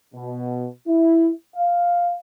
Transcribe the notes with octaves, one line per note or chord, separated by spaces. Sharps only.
B2
E4
F5